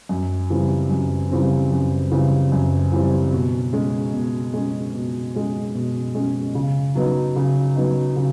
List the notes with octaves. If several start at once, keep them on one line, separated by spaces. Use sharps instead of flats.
F#2
C#3 E3 G3 C4
F#2
C#3 E3 G3 C4
F#2
C#3 E3 G3 C4
F#2
C#3 E3 G3 C4
B2
G#3 C#4
B2
G#3 C#4
B2
G#3 C#4
B2
G#3 C#4
C#3
F#3 B3 D#4
C#3
F#3 B3 D#4
C#3